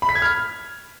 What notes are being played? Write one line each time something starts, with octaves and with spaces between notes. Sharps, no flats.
B5
B6
G#6
F6